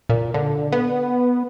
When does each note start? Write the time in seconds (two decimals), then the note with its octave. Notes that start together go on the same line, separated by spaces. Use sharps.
0.09 A#2
0.34 D3
0.72 B3